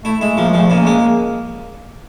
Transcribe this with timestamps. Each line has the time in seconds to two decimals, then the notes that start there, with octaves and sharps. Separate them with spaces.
0.05 A3 E4
0.21 G#3 E4
0.37 F3 A#3
0.48 G#3
0.53 F3
0.59 A3
0.70 C#3 A#3
0.86 G#3